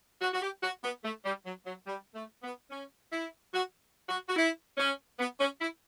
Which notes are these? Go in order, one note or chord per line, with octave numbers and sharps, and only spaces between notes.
F#4
F#4
G4
F#4
B3
A3
G3
F#3
F#3
G3
A3
B3
C#4
E4
F#4
F#4
F#4
E4
C#4
B3
C#4
E4